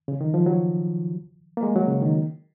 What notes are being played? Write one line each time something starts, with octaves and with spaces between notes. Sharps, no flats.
C#3
D#3
F3
F#3
A#3
G#3
F#3
C#3
D#3